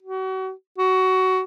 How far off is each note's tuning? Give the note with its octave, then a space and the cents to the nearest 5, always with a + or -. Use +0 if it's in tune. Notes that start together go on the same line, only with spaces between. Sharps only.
F#4 +35
F#4 +20